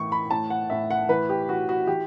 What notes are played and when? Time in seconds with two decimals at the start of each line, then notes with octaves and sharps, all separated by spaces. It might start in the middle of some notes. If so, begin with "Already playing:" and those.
Already playing: A2 E3 C#6
0.12 B5
0.31 A2 A5
0.50 F#5
0.70 A2 E5
0.90 F#5
1.09 E3 B4
1.29 G4
1.48 E3 F#4
1.69 F#4
1.87 E3 G4